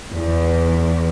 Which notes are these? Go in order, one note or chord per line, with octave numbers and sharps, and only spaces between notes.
E2